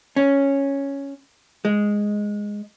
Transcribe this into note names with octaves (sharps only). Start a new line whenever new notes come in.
C#4
G#3